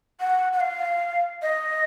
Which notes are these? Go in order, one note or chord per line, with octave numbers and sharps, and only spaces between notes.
F#5
F#5
F5
D#5